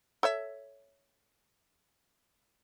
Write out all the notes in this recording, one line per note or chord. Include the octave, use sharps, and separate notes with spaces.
A4 C#5 E5